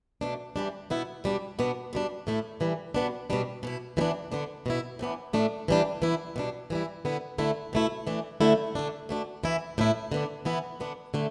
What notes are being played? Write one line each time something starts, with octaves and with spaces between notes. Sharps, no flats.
B2 A3 D4
E3 G3 D4
B2 B3 E4
B2 G3 D4
B2 B3 D4
B2 G3 D4
A2 A3 E4
E3 G3 D4
B2 G3 B3 D4
B2 G3 D4
B2 B3 E4
E3 G3 B3 D4
D3 B3 D4
B2 B3 E4
A2 E3 B3 D4
A2 A3 D4
E3 G3 D4
E3 B3 E4
B2 G3 D4
E3 G3 E4
D3 B3 E4
D3 A3 E4
B2 A3 E4
E3 A3 D4
D3 A3 E4
D3 A3 D4
B2 A3 D4
E3 B3 E4
A2 A3 E4
D3 B3 D4
E3 B3 E4
D3 B3 D4
D3 A3 E4